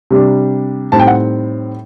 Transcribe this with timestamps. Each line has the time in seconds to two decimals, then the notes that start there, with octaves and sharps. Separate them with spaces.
0.11 C3 G3 D4
0.92 A2 G3 C4 D#4 A5
1.00 G5
1.07 F#5